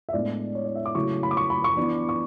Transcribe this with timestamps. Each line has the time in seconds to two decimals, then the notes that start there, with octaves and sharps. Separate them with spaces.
0.09 E5
0.13 A2 G#3 B3 D4 D5
0.55 C#5
0.65 D5
0.75 E5
0.86 D6
0.95 C#3 F#3 A3 E4 C#6
1.23 B5
1.31 D6
1.37 C#6
1.50 B5
1.64 C#6
1.77 E3 B3 D4
2.09 C#6